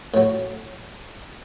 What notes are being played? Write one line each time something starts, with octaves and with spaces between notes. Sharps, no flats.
A2 F#3